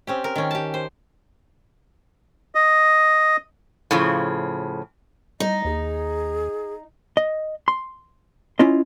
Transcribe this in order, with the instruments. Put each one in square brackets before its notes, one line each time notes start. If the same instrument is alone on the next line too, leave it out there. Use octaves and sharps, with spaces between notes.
[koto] C4 C#4 G4
A#4
D#3 C#4
G4 A5
C5
[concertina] D#5
[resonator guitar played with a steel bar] A2 C#3 F3
[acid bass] G3 [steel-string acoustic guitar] D#4 [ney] D#5
[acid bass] D#2 [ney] G#4
[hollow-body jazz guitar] D#5
C6
C#4 E4 F4 D#5